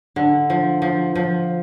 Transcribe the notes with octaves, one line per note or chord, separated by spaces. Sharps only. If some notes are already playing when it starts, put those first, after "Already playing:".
D3
F3
F3
F3